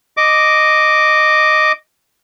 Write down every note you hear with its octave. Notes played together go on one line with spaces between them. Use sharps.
D#5 D6